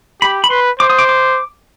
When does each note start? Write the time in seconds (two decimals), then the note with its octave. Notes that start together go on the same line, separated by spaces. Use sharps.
0.22 G4 B5
0.44 B5
0.50 B4 C6
0.79 C5 D6
0.90 D#6
0.99 D6
1.09 D6